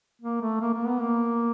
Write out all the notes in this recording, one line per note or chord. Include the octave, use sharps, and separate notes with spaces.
A#3
A3
A#3
A#3
B3
A#3